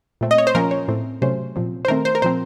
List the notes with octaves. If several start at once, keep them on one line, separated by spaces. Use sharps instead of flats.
A#2 A3 C4
D#5
C#5
C5
A#2 F3 A#3 C#4 A#4
C#5
A2 A3 C4
C3 F#3 A3 C#4 C5
A#2 F3 C4
C5
D#3 A3 C4 A#4
C5
A#4
A#2 F3 C4 C5